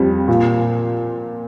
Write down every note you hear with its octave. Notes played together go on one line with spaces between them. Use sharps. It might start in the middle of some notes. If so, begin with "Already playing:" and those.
Already playing: F2 G3
A#2